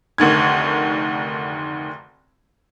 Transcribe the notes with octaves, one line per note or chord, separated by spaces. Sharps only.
F1 D2 D#3 G#6